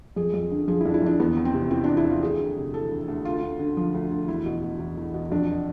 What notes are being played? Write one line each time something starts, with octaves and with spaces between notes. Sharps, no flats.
F2 G#4
F2
D3
F3 G#4
E4
F2 D4
E4
F2 D4
E2 B3
E2
C4
C3
E3 C4
E2 D4
E4
E2 F4
D2 G#4
D2
C3
E3 A4
D2
D2
D2 F4
D2
D3
F3
D2
D2
E2 E4
B2
B2
E2
E2
B2
F2 D4